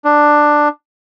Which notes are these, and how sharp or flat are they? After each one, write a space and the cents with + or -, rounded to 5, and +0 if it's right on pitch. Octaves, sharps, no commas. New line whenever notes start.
D4 +10